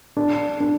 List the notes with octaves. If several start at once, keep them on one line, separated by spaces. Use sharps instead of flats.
D4
D4